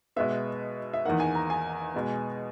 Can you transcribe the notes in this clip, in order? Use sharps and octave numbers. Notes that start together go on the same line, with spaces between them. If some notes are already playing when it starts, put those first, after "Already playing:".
B2 G#3 B3 E5
E5
E2 D#3 A#3 F#5
G#5
A#5
G#5
B2 G#3 B3